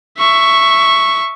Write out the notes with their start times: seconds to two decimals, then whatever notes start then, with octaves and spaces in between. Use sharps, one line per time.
0.18 E5 C#6